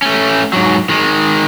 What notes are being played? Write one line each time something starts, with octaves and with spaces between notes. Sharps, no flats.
A3 C#4
G#2 F#3
D#3 G#3